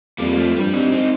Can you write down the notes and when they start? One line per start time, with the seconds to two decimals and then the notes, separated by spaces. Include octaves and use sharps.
0.18 F2 G3 A#3
0.37 F3 A3
0.55 G2 G3
0.73 C4 D#4
0.92 C4 D#4